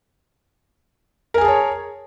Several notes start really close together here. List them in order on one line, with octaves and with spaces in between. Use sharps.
A#4 G#5 G#4 A5 C#5